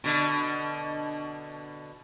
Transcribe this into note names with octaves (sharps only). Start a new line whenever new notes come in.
B2 D3